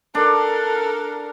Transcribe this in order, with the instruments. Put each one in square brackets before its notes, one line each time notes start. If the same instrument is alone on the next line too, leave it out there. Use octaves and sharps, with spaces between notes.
[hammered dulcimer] D4 [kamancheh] A4 A#4